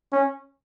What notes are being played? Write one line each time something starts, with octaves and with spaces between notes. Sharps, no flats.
C#4